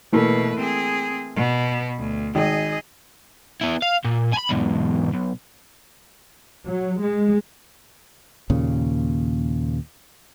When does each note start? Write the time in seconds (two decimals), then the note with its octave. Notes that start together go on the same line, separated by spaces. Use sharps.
0.12 B2 E3 A3 A#3 B4
0.58 C4 G#4
1.36 B2 B3
1.98 D2
2.35 G#1 G#4 D#5
3.61 B3 E4
3.82 F5
4.05 A#2
4.34 G#5 B5
4.51 E2 G#2
5.13 B1
6.66 F#3
7.01 G#3
8.50 D#2 A#2 C#3